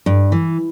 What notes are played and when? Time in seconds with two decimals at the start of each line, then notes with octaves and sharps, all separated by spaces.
0.06 G2
0.32 E3